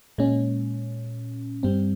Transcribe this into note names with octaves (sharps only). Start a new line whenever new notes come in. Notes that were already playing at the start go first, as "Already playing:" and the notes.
A#2 G#3 C#4
G2 G3 C4